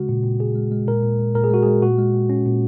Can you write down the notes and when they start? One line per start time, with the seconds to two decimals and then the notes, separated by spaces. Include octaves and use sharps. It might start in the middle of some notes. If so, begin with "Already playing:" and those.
Already playing: C#3 G#3 F#4
0.09 A#2
0.24 A#2
0.40 A#2 G#4
0.55 G#3
0.72 G#3
0.88 A#2 A#4
1.03 A#2
1.19 G#3
1.35 A#2 A#4
1.44 G#4
1.50 G#3 F#4
1.63 G#3 G#4
1.82 A#2 F#4
1.98 G#3
2.14 A#2
2.30 A#2 C#4
2.47 A#2